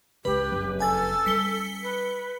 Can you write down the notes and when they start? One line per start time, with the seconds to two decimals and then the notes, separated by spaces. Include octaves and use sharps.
0.25 C#2 C#3 G4 B4
0.51 F#1 F2
0.80 A4 G#5 A6
1.26 G3 C#4 B6 C#7 G7
1.83 B4